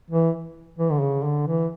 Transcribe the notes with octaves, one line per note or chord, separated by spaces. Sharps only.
E3
E3
D3
C#3
D3
E3